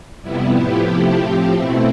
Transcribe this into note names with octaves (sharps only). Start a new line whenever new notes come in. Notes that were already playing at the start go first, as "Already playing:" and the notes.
F2 C3 G3 B3 E4
A2 F3 B3 E4 G4
C3 F3 A3 E4 G4
A2 F3 C4 G4
B2 A3 C4 E4